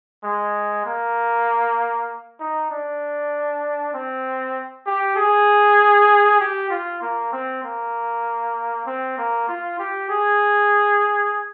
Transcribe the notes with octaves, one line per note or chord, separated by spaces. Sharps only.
G#3
A#3
D#4
D4
C4
G4
G#4
G4
F4
A#3
C4
A#3
C4
A#3
F4
G4
G#4